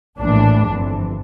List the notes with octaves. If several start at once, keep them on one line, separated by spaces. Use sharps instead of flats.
A#1 A2 E3 D4
G1 F2 E3